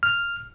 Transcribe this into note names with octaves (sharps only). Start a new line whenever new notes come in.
F6